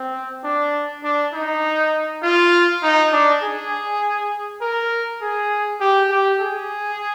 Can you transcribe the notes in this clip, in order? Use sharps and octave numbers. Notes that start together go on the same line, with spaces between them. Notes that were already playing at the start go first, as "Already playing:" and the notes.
Already playing: C4
D4
D4
D#4
F4
D#4
D4
G#4
A#4
G#4
G4
G4
G#4